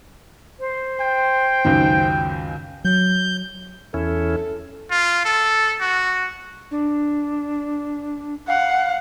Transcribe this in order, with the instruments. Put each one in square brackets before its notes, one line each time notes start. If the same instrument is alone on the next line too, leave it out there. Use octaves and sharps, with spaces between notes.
[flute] C5
[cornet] G5
[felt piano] C#2 F#2 D#3
[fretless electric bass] F#3 [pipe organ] G6
[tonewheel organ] E2 C#4 E4 [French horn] A4
[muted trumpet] F4
A4
F#4
[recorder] D4
[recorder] F5 [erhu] F#5